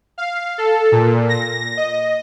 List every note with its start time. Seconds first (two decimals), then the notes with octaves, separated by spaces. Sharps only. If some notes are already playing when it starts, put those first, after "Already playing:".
0.18 F5
0.58 A4
0.92 A#2
1.29 A#6
1.77 D#5